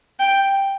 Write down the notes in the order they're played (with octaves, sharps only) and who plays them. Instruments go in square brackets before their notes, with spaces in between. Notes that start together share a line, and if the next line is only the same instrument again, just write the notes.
[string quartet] G5